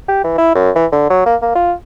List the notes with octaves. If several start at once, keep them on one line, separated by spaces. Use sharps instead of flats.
G4
E3
E4
F#2
E3
D3
F#3
A#3
A#3
F4